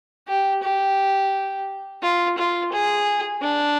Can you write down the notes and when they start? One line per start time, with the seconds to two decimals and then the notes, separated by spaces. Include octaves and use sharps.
0.28 G4
0.63 G4
2.02 F4
2.38 F4
2.73 G#4
3.42 D4